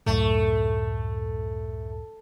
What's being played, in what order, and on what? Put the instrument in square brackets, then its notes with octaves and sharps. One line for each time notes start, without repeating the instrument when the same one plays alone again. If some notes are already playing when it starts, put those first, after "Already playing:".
[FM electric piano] C#2 F#2 A2 [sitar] A3